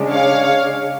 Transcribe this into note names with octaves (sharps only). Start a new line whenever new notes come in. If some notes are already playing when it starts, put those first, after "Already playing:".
Already playing: C#3 G#3 D4
C#5 F5